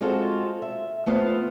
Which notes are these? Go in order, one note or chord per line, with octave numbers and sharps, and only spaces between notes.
G#3 C4 F4 F#4 A4
E5
A3 B3 F4 C5 F5